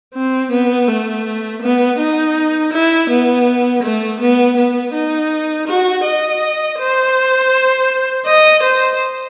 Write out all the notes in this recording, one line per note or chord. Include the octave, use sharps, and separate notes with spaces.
C4
B3
A3
B3
D#4
E4
B3
A3
B3
B3
D#4
F#4
D#5
C5
D#5
C5